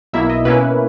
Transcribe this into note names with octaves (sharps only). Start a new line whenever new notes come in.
B1 B2 A#3 E4 E5
D#5
B2 A#3 C#4 E4 B4